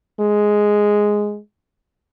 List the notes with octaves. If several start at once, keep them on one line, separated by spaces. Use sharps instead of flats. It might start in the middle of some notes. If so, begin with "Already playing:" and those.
G#3